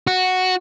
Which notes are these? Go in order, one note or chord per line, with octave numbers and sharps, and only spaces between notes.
F#4